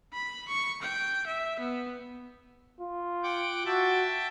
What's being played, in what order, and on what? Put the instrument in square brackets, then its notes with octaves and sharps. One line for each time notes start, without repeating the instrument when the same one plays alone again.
[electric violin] B5
C#6
G5
E5
B3
[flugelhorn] F4
[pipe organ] F#5 G5 D6
[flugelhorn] F#4 [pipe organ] E5 G5 A5